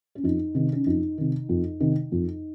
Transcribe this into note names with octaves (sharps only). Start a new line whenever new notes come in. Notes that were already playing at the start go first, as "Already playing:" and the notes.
C#4
F2 D#4
C3 D#3
C#4
F2 D#4
C3 D#3
F2
C3 D#3
F2